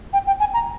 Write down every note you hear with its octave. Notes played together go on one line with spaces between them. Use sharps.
G5
G5
G#5
A#5